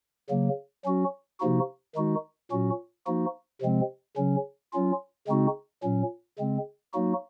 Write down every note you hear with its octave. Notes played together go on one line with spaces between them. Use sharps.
C#3 F#3 A#3
F#3 C#4 F#4
C3 F3 A#3 D#4 F#4
D#3 G#3 D#4 F#4
A#2 F#3 C#4 F#4
F3 A#3 D#4 F#4
C3 F3 G#3 C4
C#3 F#3 C#4
F#3 C#4 F4
C#3 G#3 C4 D#4 F#4
A#2 F#3 C#4
C#3 G#3 C4
F#3 A#3 D#4 F#4